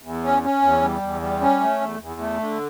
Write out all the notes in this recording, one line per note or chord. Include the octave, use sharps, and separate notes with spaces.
E2
C#4
C#4
E2
G3
E2
G3
C#4
A3
E2
E2
A3
D3